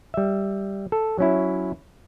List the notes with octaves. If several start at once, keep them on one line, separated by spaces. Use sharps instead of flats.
G3 E5
A4
F#3 C#4 E4